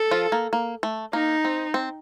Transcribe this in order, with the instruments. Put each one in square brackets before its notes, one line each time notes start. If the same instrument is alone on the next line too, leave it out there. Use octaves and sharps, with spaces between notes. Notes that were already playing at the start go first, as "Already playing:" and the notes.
Already playing: [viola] A4
[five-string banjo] F3 F4
A#3
A#3
A3
[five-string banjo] A#3 [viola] D#4
[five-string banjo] C4
C4